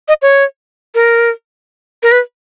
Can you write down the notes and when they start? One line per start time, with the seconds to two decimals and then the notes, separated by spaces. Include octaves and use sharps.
0.08 D#5
0.22 C#5
0.95 A#4
2.03 A#4
2.12 B4